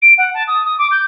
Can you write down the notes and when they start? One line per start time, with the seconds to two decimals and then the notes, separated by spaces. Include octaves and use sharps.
0.02 D7
0.18 F#5
0.34 A5
0.47 D#6
0.65 D#6
0.78 D6
0.91 G6